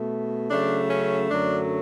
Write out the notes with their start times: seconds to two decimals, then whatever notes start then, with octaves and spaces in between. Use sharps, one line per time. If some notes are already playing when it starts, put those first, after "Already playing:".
Already playing: B2 A3
0.50 C#3 F#3 A3 D4
0.90 C#4
1.30 F#2 D3 F#3 A3 D4